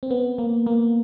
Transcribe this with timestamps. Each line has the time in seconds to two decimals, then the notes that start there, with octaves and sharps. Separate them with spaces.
0.03 C4
0.11 B3
0.38 A#3
0.66 A#3